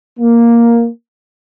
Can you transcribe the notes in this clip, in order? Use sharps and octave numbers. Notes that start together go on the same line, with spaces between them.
A#3